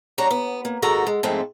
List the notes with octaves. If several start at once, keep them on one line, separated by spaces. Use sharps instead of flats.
G3 D4 F#4 C#5 A#5
B3
A#3
D#2 G#2 D#3 F#4 A4 A#5
G#3
F2 G#2 G#3 A3 C4